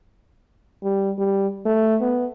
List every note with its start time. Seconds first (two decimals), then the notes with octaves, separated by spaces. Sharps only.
0.83 G3
1.18 G3
1.66 A3
2.01 B3